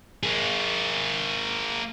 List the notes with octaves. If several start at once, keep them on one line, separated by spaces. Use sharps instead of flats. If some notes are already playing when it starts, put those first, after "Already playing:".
A#3 G#4